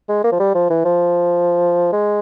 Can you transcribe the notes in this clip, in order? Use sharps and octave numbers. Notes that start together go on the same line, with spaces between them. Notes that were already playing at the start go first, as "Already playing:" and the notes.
G#3
A#3
F3
G3
F3
E3
F3
G#3